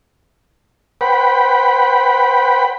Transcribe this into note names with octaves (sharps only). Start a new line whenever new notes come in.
B4 C5 F#5 G5 B5